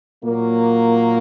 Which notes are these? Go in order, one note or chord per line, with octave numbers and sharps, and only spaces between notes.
A#2 F#3 A#3